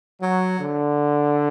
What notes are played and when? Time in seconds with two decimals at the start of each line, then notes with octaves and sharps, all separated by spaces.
0.21 F#3
0.58 D3